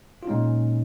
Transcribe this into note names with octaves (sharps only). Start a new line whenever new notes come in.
F4
A#2 G#3 C#4 D#4